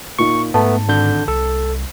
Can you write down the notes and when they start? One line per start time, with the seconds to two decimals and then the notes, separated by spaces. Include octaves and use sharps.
0.19 A#2 D#4 C#6
0.54 G#2 A3 B3 A5
0.88 G#1 D3 G6
1.28 C2 A4